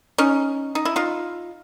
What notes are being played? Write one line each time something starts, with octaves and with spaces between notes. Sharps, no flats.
C#4 D#4
D#4
E4
D#4 F4